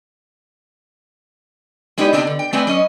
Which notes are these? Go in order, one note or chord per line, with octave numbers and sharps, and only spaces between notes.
G#3 B3 D#4 E4 G4 D5
C3 B3 C4 D4 D#4 G4
D3
G5
A3 C4 B4 D5 G#5
F#3 C#4 D#5